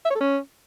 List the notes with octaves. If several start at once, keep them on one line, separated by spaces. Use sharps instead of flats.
E5
C#5
A4
C#4